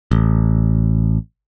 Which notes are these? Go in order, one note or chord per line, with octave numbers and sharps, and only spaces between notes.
A1